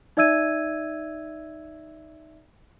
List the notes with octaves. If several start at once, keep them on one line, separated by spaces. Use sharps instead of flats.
D#4 D5 E5 E6 G#6 D#7